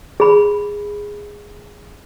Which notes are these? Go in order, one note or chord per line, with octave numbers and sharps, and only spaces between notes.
G#4 B5